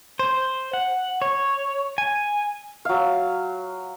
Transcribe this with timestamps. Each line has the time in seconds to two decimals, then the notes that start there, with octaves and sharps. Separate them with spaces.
0.19 C5
0.73 F#5
1.22 C#5
1.98 G#5
2.85 F#3 F5